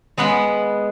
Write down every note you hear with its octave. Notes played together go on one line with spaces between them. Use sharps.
G#3 B3 F#5 B5